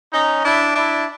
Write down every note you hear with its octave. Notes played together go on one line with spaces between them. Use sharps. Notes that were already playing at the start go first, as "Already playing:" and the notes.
C#4 D#4
D4 E4
D4 E4